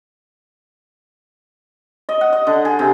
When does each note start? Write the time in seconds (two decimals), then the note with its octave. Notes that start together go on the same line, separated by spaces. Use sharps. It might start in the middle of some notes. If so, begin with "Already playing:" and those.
2.09 D#5
2.21 F#5
2.33 D#5
2.47 D3
2.65 G#4
2.79 C3